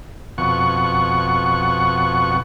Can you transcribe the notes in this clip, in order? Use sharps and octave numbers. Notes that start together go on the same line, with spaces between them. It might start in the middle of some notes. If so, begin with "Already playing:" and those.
F2 B2 F#5 C#6